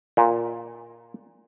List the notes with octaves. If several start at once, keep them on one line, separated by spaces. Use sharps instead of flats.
A#2